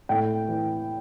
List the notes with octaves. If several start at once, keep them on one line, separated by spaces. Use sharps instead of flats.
A2 G5
E3